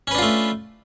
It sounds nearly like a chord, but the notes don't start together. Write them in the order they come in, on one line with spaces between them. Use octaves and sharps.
C#4 B4 D4 F4 A3